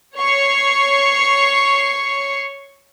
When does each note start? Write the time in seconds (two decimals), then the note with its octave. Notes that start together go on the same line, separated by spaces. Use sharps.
0.17 C#5 C#6 C7